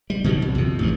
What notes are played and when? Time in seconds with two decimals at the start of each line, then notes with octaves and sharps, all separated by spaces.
0.10 G3
0.24 B2 D#3 F3 F#3
0.42 C2
0.55 F2 C3
0.79 A1 G2